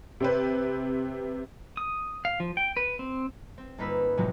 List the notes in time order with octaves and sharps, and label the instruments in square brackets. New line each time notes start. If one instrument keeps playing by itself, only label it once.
[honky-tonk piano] C3 C4 B4
[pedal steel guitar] D#6
F5
F3
G5
B4
C4
[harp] C4
G1 A#3 D#4 B4 B5 E6
A2 C3 F3 F#3 G#3